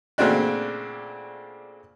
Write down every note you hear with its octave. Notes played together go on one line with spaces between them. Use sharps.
A#2 C#3 A3 C4 D4 F#4